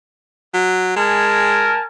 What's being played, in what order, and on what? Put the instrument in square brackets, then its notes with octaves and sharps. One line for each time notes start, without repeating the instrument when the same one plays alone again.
[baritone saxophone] F#3
[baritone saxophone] G#3 [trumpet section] A#4 G#5 A5